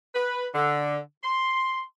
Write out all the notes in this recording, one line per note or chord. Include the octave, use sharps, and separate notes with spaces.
B4
D3
C6